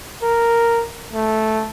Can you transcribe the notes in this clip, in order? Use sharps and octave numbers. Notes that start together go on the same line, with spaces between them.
A#4
A3